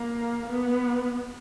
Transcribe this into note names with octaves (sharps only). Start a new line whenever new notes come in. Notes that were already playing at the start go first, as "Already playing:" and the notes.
Already playing: A#3
B3